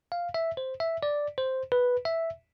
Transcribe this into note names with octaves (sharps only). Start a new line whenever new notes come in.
F5
E5
C5
E5
D5
C5
B4
E5